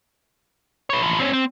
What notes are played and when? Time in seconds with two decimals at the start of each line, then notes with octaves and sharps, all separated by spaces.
0.90 B4 C#5
1.02 E3 F3
1.20 C4 C#4
1.33 C4